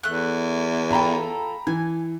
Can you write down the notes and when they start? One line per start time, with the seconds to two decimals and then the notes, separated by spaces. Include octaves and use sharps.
0.03 E2 A3 F#6
0.91 F4 A4 G5 A#5 B5
1.67 E3 G#5